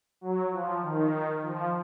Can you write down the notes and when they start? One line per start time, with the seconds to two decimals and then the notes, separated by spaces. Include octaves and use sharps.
0.21 F#3
0.51 F3
0.82 D#3
1.42 F3